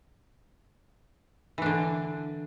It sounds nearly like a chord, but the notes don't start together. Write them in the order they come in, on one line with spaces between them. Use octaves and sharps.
E3 D4 D3